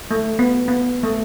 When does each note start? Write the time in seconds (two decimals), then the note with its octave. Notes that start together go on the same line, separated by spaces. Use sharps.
0.11 A3
0.39 B3
0.68 B3
1.03 A3